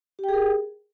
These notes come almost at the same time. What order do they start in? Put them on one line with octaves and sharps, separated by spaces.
G4 G5 G#4 A#4